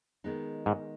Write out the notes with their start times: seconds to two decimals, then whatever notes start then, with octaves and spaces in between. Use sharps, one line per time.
0.24 D#3 G#3 B3 D#4
0.66 G#2